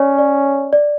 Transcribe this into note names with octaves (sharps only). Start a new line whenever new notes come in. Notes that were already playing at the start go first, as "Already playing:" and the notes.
Already playing: C#4 C#5 D5
D5
D5